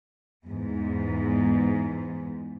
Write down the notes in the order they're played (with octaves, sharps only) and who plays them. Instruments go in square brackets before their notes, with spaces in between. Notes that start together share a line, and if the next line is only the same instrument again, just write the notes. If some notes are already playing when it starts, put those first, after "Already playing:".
[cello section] E2 G#2